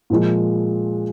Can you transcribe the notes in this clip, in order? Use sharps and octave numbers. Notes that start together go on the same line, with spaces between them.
A#2 F3 G#3